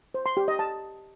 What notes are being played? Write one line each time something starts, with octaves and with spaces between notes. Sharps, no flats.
C5
C6
G4
D#5
A5